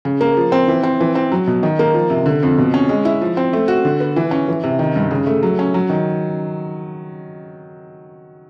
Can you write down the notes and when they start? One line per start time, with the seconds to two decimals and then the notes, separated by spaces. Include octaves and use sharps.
0.05 C#3
0.21 A#3
0.37 F3
0.52 C4
0.68 E3
0.83 C4
1.00 E3
1.15 C4
1.32 F#3
1.47 B2
1.63 D#3
1.79 A#3
1.94 F3
2.10 C3
2.26 D3
2.43 F2
2.58 B2
2.74 C#4
2.89 G#3
3.05 E4
3.21 F3
3.37 C4
3.53 A3
3.68 F#4
3.85 D3
4.00 B3
4.16 E3
4.31 C#4
4.48 E3
4.64 C3
4.79 D#3
4.96 G2
5.11 C#3
5.27 A3
5.43 F#3
5.59 C#4
5.74 F#3
5.89 D#3